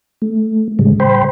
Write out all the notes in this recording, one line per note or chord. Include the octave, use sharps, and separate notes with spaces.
A3
A2 C#3 G3 G#3
C5 G5 B5 C6